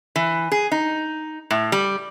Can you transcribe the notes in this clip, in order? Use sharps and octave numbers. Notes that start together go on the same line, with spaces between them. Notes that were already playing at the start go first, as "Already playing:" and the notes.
E3
G#4
D#4
A2
G3